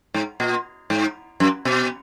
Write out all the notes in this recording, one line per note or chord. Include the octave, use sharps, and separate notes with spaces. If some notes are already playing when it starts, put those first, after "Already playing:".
G#2
A#2
G#2
F#2
B2